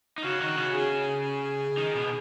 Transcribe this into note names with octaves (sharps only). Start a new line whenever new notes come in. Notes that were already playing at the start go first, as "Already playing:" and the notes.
D#4
C#3 C#4 F#4
D#3 D#4
C#3 C#4
G#4
D#3 D#4
B2 B3